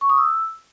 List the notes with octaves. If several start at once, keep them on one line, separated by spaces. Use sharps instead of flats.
C#6
D#6
E6